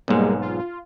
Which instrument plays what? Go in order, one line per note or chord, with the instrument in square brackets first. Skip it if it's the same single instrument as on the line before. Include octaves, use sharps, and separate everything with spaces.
[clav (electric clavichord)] B1 G#2 [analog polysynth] G3 G#3 A#3
[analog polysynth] F4